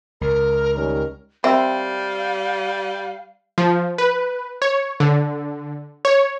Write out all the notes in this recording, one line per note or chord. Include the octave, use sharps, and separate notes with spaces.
C#2 A#4
D#3 G3 C#4 A#4
G3 C4 A#4 E5 F5 B5
F3
B4
C#5
D3
C#5